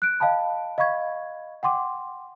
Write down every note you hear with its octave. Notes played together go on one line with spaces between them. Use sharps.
F#6 D7
D#5 F5 G5 A5 B5
D#5 F5 B5 C#6 G#6
F#5 G5 C6 D6